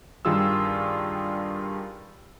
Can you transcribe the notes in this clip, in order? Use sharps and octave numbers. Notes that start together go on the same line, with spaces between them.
G2 D#3 G3 F4 G#4 E6